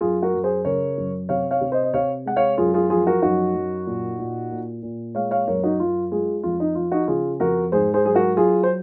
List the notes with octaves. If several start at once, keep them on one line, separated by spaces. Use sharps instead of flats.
F#2 F4 G#4
F#4 A#4
F#2
G#4 C5
C#3 A#4 C#5
F#2
C3 C#5 F5
C#5 F5
C3
C5 D#5
D#5
C3 C#5 F5
G#3 F#5
C#5 F5
F#2 F4 G#4
F4 G#4
F3 F4 G#4
F#4 A#4
F#2 D#4 F#4
F#2
A#2
A#2
A#2
A#2
G#3 C#5 F5
C#5 F5
F#2 A#4 C#5
D#4 F#4
F#2 F4
G#3 F4 G#4
F2 F4
D#4
F3 F4
D#4 F#4
C#3 F4 G#4
F2 F#4 A#4
G#2 G#4 C5
G#4 C5
F#3 G#4
F#4 A#4
F#3 F4 G#4
C5